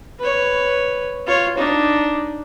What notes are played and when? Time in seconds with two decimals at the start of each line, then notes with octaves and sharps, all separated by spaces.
0.20 B4 C#5
1.27 F4 C#5
1.58 D4 D#4